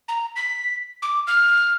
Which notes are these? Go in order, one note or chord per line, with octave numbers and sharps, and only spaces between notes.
A#5
B6
D6
F6